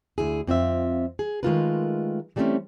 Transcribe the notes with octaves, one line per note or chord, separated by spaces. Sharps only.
D2 E4 G#4
F2 C4 F4 E5
G#4
D#3 G#3 A3 F4 A#4 B4
E3 G3 A3 A#3 C4 C#4